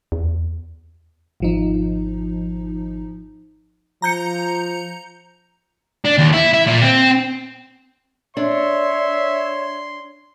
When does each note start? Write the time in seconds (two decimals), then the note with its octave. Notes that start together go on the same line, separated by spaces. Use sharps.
0.12 E2
1.40 G#1 F3 D#4
4.02 F3 A#5 G6 C#7
6.05 D4
6.18 D#2
6.33 E4
6.53 E4
6.67 A#2
6.82 C4
8.37 D4 C#5 E5 C6